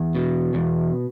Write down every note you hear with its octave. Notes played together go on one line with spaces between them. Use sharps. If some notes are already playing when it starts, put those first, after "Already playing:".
Already playing: E2
B2
E2